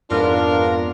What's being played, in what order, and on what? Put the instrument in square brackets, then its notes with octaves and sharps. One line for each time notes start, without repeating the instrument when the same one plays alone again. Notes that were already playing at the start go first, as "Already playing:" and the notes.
[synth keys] F2 G#2 B3 [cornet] D4 [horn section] F4 A#4